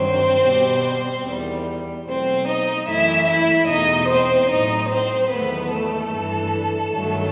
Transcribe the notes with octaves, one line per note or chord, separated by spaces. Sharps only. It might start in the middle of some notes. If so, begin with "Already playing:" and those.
Already playing: G2 D#3 F#3 C4 C5
B2 G3
E2 D#3 G3
B2 F#3 A3 C4 C5
D#4 D#5
F#2 E3 A3 E4 E5
E4 E5
E2 B2 A3 D#4 D#5
C4 C5
A2 F#3 A3 D#4 D#5
C4 C5
E2 D#3 F#3 A3 B3 B4
A3 A4
G2 E3 A3
G2 D#3 F#3 A3